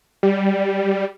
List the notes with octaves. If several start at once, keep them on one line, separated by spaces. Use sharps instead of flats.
G3